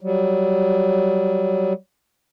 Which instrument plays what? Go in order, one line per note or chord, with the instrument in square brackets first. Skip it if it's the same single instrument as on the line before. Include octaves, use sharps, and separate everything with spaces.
[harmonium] F#3 G3